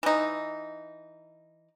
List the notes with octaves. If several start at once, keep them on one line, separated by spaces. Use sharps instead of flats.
E3 D#4